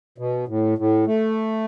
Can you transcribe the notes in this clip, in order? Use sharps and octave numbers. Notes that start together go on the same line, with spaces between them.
B2
A2
A2
A3